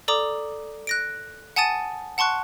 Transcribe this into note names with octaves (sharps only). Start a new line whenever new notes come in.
A4 D5 A#5 D6 D#6
F#6 A#6 D7
F#5 G#5 A5 D#6 A6 D#7
F#5 A5 C6 C#6 F#6